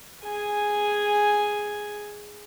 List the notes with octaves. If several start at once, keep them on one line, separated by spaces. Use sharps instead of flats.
G#4 G#5